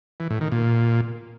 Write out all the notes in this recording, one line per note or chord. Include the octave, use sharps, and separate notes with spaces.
E3
A2
D#3
A#2